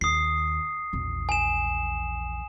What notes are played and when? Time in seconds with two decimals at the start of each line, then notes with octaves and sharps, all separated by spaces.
0.01 D#2 D#6 C7
0.93 A#1 E2
1.29 G#5 E7